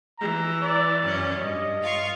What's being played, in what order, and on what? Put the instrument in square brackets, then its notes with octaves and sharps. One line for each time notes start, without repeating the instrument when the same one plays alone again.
[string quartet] E3 [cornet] A#5
[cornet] D5
[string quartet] F#2 C#4
[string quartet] G2 [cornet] D#5
[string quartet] F4 F5 C#6